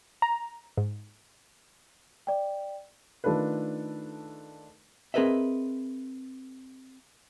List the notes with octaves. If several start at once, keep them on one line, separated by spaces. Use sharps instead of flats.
A#5
G#2
D5 G5
D#3 A3 D4 F4 A4 B4
C4 G#4 A#4 B4 D#5 E5